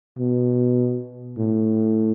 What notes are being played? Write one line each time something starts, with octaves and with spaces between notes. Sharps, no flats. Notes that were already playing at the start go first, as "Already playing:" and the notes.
B2
A2